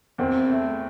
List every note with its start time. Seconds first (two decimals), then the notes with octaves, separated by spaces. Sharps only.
0.18 E2 C4
0.50 A3